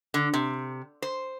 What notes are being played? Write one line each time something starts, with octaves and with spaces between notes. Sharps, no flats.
D3
C3
C5